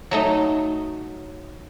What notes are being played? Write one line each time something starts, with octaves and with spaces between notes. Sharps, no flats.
F#3 A3 D#4